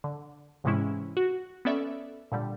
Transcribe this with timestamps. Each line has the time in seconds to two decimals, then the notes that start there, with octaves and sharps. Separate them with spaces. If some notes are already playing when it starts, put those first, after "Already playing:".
0.04 D3
0.64 G#2 C3 E3 G#3 C#4 E4
1.17 F#4
1.65 B3 C#4 A4 D5 E5
2.32 A#2 D3 G3